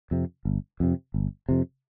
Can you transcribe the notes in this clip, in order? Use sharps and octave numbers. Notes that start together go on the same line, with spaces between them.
F2 C3
G1
F2 C3
G1
F2 C3